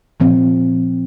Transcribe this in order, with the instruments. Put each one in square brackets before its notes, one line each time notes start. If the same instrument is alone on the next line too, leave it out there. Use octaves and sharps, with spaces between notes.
[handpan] A#2 F3 C4